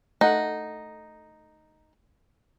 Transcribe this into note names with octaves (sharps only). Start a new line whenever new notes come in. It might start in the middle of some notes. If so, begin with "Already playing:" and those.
A3 D#4 F#5